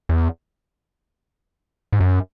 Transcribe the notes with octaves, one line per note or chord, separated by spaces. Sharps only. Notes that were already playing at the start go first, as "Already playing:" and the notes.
E2
G#2
F#2